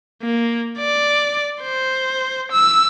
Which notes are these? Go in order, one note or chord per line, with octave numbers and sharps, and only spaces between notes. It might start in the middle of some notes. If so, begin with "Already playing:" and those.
A#3
D5
C5
E6